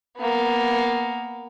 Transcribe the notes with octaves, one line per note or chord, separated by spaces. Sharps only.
A#3 B3